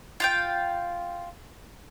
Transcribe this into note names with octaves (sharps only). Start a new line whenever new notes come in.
F4 F5 G5